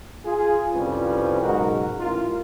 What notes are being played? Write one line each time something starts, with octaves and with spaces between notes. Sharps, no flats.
F4 G#4
C2 F2 F3 G3 C#4 B4
B1 G#2 C#3 D#4 F#4 A#4
A1 F4 A#4